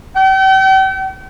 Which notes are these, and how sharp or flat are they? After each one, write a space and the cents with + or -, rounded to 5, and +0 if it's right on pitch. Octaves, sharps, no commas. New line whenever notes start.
G5 -40